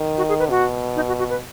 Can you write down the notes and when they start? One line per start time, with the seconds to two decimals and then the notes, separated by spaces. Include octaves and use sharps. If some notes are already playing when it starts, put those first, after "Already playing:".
Already playing: D#3
0.17 F#4
0.29 G#4
0.39 B4
0.50 B2 F#4
0.96 D#4
1.07 F#4
1.19 F#4
1.30 B4